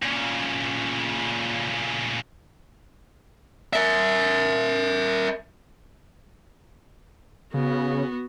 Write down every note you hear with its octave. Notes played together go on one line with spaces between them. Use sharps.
A#2 C#3
A#4 E5
C#3 B3 F#4